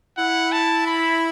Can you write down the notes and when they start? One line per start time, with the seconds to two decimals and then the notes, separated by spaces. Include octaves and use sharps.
0.18 E4 F#5
0.52 A5
0.87 B5